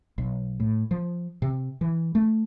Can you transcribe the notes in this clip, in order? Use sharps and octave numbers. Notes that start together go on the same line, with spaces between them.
B1
A2
F3
C3
E3
A3